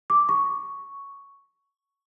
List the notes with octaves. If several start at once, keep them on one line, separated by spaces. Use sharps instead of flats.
D6
C#6